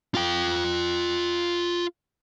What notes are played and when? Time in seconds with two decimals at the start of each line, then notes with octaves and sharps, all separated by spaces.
0.15 F4 G5